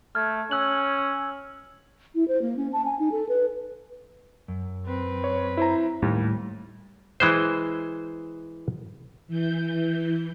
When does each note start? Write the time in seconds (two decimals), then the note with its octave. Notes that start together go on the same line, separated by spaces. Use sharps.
0.15 A3 F6 G#6
0.51 C#4 E6 F#6 F#7
0.98 E6
2.15 E4
2.28 C5
2.42 A#3
2.57 C#4
2.73 A5
2.85 G#5
2.99 D#4
3.12 A4
3.29 B4
4.48 F#2
4.86 C4 B4
5.24 C#5
5.57 E4 C5 A#5
6.02 D#2 A2 G3
7.20 E3 G#3 C5
9.28 E3 G6